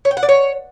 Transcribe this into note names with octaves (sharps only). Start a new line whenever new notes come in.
C#5
G5
F#5
D5
C#5